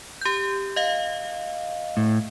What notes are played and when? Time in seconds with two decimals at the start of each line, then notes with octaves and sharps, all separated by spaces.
0.21 G4 G6
0.76 D#5 F5
1.97 A2